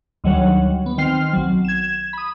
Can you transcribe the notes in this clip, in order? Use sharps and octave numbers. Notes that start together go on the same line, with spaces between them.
D2 D#3 F#3 G3 C#5 F#5
B3
D#3 C4 G5 F6 C7
B1 F#3
G#6 E7
B5 D#6